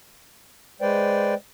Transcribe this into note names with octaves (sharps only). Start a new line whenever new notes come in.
G#3 B4 C5 D5 G5